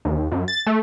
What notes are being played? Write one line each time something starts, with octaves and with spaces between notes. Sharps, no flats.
D#2
F#2
A6
A3